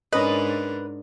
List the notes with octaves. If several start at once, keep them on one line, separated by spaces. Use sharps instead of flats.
G#2 C#4 D4 A#4 B4 D#5